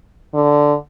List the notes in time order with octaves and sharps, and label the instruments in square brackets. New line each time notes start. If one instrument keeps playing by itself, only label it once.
[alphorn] D3